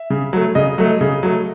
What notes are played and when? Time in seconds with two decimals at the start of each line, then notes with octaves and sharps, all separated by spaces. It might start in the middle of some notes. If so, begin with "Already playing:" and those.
Already playing: E5
0.10 C#3
0.33 F#3 A3
0.55 C#3 D#5
0.78 F#3 A3
1.01 C#3
1.23 F#3 A3